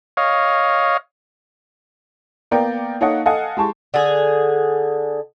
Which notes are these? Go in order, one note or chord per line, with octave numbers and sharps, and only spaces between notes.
C#5 D#5 F5
A#3 B3 A#4 D5 G5
A#3 D#4 A4 C#5 D#5 F#5
A4 D#5 F5 F#5 G#5
G#3 G4 A5 C#6
D3 G#4